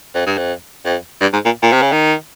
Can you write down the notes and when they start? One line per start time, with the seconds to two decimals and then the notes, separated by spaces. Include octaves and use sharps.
0.15 F2
0.26 G2
0.38 F2
0.85 F2
1.21 G2
1.33 G#2
1.45 A#2
1.63 A#2
1.72 C3
1.82 C#3
1.92 D#3